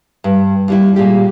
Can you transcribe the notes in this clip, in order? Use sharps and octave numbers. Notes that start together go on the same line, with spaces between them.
G2
D#2 G3 E4
A#2 G3 G#3 G4